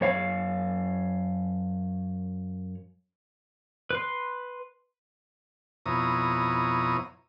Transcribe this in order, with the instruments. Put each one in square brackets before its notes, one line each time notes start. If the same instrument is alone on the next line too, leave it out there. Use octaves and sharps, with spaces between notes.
[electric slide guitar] F#2 C#5 F5
[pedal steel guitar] B4 C6
[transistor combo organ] F2 B2 E4 C#5 A#5 D#6